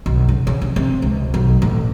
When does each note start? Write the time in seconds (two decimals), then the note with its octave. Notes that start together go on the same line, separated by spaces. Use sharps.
0.06 B1
0.29 C#3
0.47 C#3
0.62 C3
0.76 C3
1.02 C#2
1.34 B1
1.62 A1